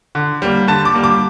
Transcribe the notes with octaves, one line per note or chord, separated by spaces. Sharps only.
D3
G3 A#3
D3 A5
D6
G3 A#3
D6